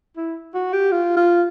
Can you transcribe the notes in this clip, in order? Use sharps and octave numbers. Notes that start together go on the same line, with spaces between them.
E4
F#4
G4
F4
F4